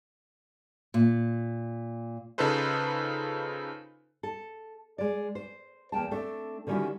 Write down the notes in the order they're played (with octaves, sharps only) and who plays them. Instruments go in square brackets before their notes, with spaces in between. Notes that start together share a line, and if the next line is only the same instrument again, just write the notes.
[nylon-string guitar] A#2
[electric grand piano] C#3 D#4 F4 A4 B4 C5
[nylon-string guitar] A4
G#3 D5
C5
E2 A#3 G5 A5
A3 C4 D4 A4
D3 D#3 G3 C#4 E4 F#4